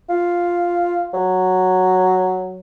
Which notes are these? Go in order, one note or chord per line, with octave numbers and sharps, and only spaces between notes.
F4
F#3